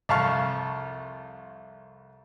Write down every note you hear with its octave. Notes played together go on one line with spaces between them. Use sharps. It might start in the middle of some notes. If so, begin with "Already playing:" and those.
C2 F2 F5 A5 C#6 F6